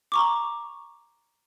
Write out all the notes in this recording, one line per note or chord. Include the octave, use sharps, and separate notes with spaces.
A#5 C#6 D6